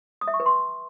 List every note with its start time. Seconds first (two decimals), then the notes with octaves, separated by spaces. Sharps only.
0.21 D#6
0.28 E5
0.34 C#6
0.40 B4
0.46 C6